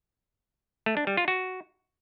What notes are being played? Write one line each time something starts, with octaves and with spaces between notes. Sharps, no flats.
A3
D4
G3
F4
F#4